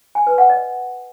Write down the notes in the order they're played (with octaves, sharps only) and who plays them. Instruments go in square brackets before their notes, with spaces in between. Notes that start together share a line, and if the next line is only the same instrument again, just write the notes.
[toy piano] G#5
B4
F#5
D#5